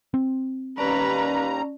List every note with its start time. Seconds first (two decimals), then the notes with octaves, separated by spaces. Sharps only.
0.14 C4
0.78 D#2 G3 C#4 B4 D5 A5 A#5